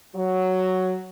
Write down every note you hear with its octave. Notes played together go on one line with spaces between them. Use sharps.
F#3